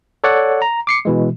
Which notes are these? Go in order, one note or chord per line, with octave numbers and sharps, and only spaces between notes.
A4 C#5 D5 F#5
A#5
D6 C7 C#7
B2 E3 G#3